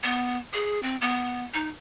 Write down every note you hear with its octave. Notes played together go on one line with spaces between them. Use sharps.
B3
G#4
C4
B3
D#4